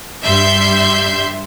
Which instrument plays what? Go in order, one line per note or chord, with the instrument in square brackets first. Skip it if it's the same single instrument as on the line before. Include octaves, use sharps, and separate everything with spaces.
[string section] G2 G3 E5 C6 G6